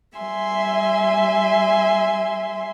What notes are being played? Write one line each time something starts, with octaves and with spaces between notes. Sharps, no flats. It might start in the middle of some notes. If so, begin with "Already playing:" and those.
G3 E5 G#5 C6